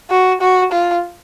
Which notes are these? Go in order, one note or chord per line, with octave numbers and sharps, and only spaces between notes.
F#4
F#4
F4